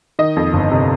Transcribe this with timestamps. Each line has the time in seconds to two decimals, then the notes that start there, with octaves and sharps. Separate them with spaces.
0.19 D#3 D#5
0.36 F2
0.53 G1
0.71 C3